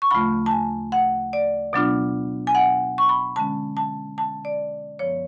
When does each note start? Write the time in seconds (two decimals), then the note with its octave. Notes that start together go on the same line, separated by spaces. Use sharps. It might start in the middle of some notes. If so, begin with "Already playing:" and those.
0.02 C#6
0.11 D2 C#3 F3 A3 F4 B5
0.46 A5
0.51 G#5
0.92 F#5
1.33 D5
1.73 B2 F#3 B3 D4 F4
2.47 G#5
2.55 F#5
2.98 C#6
3.09 B5
3.36 D3 G#3 C#4 A5
3.77 A5
4.18 A5
4.45 D5
4.99 F#2 F3 B3 C#5